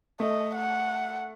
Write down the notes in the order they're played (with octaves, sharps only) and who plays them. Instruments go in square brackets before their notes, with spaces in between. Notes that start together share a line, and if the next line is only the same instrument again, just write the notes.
[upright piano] A3 [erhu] D#5
[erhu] F#5